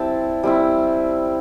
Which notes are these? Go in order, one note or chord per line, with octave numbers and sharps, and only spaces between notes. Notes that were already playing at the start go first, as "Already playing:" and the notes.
Already playing: G3 C4 E4 A5
G3 C4 E4